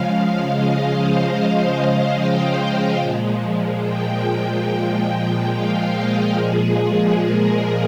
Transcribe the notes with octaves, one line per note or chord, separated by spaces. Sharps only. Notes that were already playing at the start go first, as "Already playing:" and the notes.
Already playing: C#3 F3 G#3 F5
D#5
C5
D#5
D#5
G5
A#2 F3 G#3
G5
F5
D#5
A#2 F3 G#3 G#4
A#4